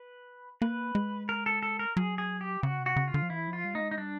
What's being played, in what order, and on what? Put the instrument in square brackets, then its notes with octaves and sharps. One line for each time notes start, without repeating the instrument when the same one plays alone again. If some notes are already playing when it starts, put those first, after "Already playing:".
Already playing: [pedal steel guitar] B4
[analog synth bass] A#3 [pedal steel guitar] B4
[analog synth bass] G#3
[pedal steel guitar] A#4
A4
A4
A#4
[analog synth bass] F#3 [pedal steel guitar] G#4
[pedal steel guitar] G#4
G4
[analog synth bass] C#3 [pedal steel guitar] F#4
[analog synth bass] C3
[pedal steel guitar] F#4
[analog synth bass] C#3
[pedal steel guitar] F4
[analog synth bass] D3
F3
[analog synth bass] E3 [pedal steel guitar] E4
[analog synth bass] F3
[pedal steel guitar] F4
[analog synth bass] G3
[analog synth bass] A3 [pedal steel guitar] D#4
[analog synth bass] G#3
[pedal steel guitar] D#4
[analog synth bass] G3 [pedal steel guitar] D4